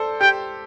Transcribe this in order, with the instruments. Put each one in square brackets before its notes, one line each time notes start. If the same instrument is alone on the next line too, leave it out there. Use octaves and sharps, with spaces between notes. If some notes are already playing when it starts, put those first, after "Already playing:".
Already playing: [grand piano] A4 C5 D5
[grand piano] G4 [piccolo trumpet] G5